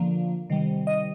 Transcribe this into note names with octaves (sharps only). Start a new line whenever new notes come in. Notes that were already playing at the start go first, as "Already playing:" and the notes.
Already playing: D3 F3 A#3
C3 D#3 G3
D#5